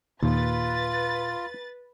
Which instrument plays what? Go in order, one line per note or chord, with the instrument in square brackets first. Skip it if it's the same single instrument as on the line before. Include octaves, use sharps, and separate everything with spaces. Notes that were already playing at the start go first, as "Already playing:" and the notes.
[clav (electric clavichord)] D#2 [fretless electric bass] A#2 [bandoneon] F4 [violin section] B4 A6